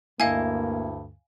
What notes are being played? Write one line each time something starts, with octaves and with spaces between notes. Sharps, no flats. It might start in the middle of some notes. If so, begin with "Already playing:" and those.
D2 G2 D3 A#3 E4 D#5 F5 G#5